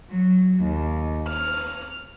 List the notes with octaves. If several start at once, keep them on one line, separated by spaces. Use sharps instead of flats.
F#3
D#2
F6